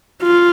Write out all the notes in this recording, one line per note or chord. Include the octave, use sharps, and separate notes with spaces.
F4